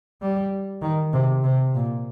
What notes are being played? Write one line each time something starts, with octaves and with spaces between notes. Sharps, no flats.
G3
D#3
C3
C3
A#2